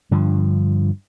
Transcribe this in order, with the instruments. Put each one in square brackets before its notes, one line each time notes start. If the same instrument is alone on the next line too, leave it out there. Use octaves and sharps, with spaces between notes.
[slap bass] G2 D3 F3